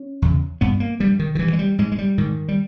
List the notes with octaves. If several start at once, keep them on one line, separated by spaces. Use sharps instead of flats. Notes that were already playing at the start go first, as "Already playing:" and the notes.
Already playing: C#4
E2 C#3
G2 B3
A#3
G2 G3
D#3
D#3
G2 E3
G#3
G3
G#2 G#3
G#3
G3
G#2 D#3
G3